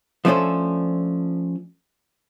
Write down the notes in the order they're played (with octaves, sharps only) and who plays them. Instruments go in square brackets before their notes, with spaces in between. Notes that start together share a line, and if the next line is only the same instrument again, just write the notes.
[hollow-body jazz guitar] F3 A3 C#4 D4 A4 C5